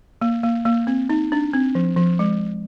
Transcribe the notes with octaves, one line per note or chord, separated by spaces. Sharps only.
A#3
A#3
A#3
C4
D#4
D4
C4
F3
F3
G#3